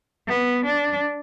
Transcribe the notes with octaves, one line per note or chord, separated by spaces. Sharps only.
B3
D4